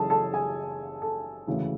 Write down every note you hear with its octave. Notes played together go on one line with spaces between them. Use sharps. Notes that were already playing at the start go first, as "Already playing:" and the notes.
Already playing: F#1 F#2 C#3 E3 G#3 G#4 A4 A5
A4 A5
G#4 G#5
A4
E1 D2 C#3 E3